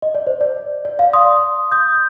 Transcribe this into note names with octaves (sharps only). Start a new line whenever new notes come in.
D#5
D5
C5
D5
D5
D5 F5
C6 D#6
D#6 G6